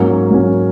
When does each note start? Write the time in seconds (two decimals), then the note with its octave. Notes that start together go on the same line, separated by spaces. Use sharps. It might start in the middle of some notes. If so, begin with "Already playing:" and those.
Already playing: G#2 F#3 A#3 C#4
0.30 G#2 F#3 A#3 C#4